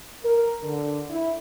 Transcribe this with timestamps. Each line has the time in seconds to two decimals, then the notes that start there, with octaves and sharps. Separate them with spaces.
0.24 A#4
0.63 D3
1.09 E4